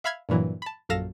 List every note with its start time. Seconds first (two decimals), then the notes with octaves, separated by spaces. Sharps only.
0.04 E5 F5 B5 F6 G#6
0.29 G2 A#2 E3 F#3
0.62 A5 B5
0.89 A#1 F#2 A4 F5 A#6 E7